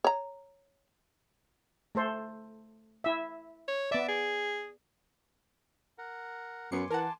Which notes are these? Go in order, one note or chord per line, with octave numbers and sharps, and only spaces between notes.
C#5 A#5
A3 A4 C5
E4 E5
C#5
B3 D5 E5
G#4
A#4 F#5
F#2 B3 G#5 C6 D6 C#7
E3 A#4 F#5 A5